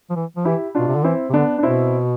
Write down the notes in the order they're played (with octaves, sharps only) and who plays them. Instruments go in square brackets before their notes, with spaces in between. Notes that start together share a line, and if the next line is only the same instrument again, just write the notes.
[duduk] F3
E3
F3
[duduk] E3 [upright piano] E4 G4
[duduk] B2 [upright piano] D4 F4
[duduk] C3
D3
[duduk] E3 [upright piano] C4 E4
[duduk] C3
[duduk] D3 [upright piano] B3 D4
[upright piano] D4
[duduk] B2 [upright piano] C4 E4